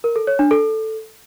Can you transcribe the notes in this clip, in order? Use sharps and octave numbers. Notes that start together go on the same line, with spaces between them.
A#4
A4
C#5
D4
A4